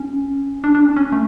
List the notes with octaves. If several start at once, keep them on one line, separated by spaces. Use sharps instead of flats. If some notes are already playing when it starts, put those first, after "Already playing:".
Already playing: C#4
D4
D4
C#4
C#4
A3